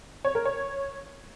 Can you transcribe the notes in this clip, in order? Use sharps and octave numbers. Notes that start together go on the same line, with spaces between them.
C#5
A#4
C#5